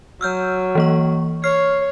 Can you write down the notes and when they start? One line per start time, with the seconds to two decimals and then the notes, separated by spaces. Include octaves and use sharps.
0.21 F#3 E6 F6 G6
0.75 E3 A#3 C#6
1.44 C#5 F6 C7